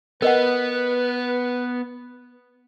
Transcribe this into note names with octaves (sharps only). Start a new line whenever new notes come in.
B3 A#4 B4 D#5 F#5